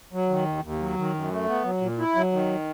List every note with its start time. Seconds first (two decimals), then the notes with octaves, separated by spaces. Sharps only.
0.13 F#3
0.29 D#3
0.46 D#2
0.63 D#2
0.80 F#3
0.97 D#3
1.14 F#2
1.31 A3
1.48 B3
1.64 F#3
1.81 A#2
1.99 E4
2.15 F#3
2.32 D#3